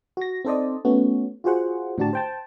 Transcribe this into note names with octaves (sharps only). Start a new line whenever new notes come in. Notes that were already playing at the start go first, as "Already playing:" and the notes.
F#4 A#6
C4 D#4 A4 C5 D5 D#5
A3 B3 C#4 F#4
F4 F#4 G#4 C5 F#5
A2 D3 D4 F#4 G4 A5
C5 G5 A5